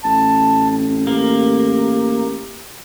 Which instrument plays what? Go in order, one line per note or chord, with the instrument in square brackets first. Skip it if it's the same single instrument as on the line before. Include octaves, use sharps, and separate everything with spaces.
[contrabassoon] A1 [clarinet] A5
[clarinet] C4
[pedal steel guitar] A#3 [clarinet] G4